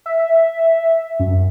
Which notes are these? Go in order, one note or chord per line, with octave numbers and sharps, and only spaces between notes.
E5
F#2